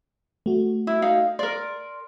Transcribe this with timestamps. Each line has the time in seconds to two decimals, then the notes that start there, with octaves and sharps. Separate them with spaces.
0.46 A3 F#4
0.87 E4
1.02 D#4 F5
1.39 A#4 D5 C6